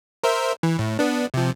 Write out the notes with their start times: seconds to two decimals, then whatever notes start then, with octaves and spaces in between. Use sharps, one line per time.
0.23 A#4 C5 E5
0.63 E3
0.79 A2
0.99 B3 D4
1.34 C3 F3